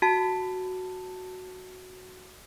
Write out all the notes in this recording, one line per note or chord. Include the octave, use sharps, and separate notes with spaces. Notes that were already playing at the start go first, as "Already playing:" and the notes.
F#4 A5